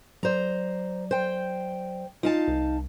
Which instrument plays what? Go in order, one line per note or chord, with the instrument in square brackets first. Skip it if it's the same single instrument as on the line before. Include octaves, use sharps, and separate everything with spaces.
[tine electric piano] F#3 D5 [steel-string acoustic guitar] C5 A#5
[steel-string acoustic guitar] C5 G5
[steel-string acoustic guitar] D#4 F5 A5 [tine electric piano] F4
[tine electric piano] C2